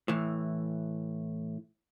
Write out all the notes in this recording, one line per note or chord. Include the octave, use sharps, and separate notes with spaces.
A2 E3